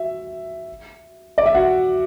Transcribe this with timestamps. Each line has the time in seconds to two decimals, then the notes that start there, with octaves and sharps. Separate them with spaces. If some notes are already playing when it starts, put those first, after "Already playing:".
Already playing: F#4 E5
1.38 D5
1.46 E5
1.55 F#4 F#5